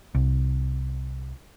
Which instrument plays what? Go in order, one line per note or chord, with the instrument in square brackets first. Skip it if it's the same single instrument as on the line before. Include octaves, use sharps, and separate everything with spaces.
[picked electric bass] C2